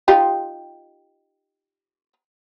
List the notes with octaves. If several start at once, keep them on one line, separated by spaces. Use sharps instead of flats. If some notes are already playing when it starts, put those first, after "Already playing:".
D#4 F4 G4